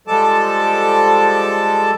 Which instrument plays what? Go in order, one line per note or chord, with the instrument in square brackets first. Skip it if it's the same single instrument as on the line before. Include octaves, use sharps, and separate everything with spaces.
[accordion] F3 G3 G#3 A4 A5 D6